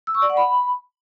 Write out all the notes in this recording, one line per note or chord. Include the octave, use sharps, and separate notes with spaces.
E6
C#6
D5
F#5
B5